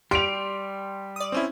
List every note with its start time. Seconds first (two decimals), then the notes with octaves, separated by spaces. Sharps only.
0.11 G3 G4 C6 D7 F7
1.16 D5 D#6
1.32 C4 C#4 E4